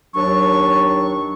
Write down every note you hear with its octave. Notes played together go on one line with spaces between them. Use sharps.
D#2 F#3 D4 C#6